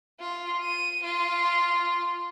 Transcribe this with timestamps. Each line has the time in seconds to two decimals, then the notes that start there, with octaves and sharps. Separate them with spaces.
0.20 F4
0.63 D#7
1.03 F4